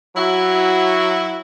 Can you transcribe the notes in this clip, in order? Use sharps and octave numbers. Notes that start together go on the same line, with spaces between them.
F#3 E4 F#4